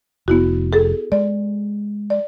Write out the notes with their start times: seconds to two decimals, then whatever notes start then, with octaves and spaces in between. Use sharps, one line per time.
0.28 F1 B3 E4 F#4
0.73 G#4 A4
1.12 G#3 D5
2.10 D5